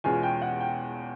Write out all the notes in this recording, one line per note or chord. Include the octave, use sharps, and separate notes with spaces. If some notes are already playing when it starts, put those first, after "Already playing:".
E2 B2 G#3 C#4 F4 G#5
G5
F#5
G5